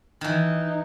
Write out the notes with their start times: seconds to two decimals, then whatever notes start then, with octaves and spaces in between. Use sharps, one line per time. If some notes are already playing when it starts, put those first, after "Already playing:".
0.21 D#3 E3 D#4